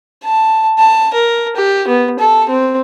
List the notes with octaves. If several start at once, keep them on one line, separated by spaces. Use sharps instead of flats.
A5
A5
A#4
G4
B3
A4
C4